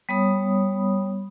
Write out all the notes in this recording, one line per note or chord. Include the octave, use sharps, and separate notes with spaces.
G3 B3 C#5 B5 D#6